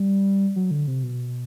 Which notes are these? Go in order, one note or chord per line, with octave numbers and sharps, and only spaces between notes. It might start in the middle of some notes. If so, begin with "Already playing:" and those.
Already playing: G3
F#3
D3
C3
B2